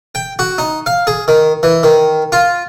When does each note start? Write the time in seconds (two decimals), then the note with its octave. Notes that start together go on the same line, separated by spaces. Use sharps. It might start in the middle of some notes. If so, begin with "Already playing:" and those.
0.15 G5
0.39 F#4
0.58 D#4
0.86 F5
1.07 G#4
1.28 D#3
1.63 E3
1.83 D#3
2.32 F4